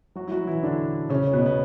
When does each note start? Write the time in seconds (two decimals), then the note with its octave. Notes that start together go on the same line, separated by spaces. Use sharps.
0.16 F#3 F#4
0.27 E4
0.32 F#3 F#4
0.47 E3 E4
0.63 D3 D4
1.10 C#3 C#4
1.27 C#4
1.33 B2 B3
1.46 B3